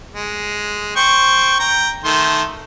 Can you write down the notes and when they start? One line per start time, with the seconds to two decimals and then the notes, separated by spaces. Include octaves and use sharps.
0.13 G#3
0.97 C5 G5 C#6
1.60 G5 A#5
2.04 D#3 A3 C6